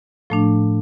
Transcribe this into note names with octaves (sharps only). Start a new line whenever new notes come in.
A2 F3 A3 D4